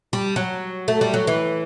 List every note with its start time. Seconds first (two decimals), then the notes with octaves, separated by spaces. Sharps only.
0.13 G3
0.36 F#3
0.88 A3
1.01 G3
1.14 F#3
1.27 E3